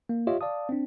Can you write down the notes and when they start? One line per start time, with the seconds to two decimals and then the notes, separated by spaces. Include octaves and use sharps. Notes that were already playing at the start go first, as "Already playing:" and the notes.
0.09 A#3
0.27 F4 G4 C#5 D#5 E5
0.41 D5 F5 A5 D#6
0.69 C4 D4